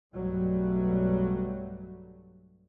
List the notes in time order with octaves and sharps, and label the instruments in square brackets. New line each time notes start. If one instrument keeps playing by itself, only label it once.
[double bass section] B1 G2 F#3 G3 A3